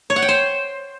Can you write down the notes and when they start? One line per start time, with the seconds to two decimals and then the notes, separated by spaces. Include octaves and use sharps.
0.10 C#5
0.16 F#5
0.22 G5
0.28 C5